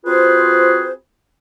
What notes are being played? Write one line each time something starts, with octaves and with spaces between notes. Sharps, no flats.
C4 F4 F#4 G#4 B4 C5